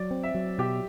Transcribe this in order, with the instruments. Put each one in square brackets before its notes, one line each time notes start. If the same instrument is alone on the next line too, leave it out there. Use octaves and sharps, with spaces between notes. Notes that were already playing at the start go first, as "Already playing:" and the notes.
Already playing: [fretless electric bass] F#3 [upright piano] D5
[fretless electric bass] C4
[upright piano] E5
[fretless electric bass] F#3
[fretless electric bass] B2 [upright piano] G4